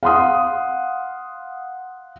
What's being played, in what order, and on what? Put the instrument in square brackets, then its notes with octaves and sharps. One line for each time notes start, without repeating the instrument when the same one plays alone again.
[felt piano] F5 F#5 C6 D#6